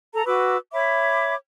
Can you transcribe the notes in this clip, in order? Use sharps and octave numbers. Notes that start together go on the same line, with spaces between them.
A4 A#5
F#4 B4 D6 E6
C#5 E5 B5 D6